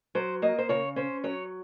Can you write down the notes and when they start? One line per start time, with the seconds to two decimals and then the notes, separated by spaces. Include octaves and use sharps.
0.15 F#3 C5
0.42 A#3 D#5
0.58 C5
0.69 C#3 C#5
0.96 C#4 C5
1.24 F#3 C#5